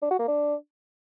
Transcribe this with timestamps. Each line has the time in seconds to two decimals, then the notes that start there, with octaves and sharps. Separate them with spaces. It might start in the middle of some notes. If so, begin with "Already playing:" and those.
0.02 D4
0.11 F#4
0.19 A#3
0.28 D4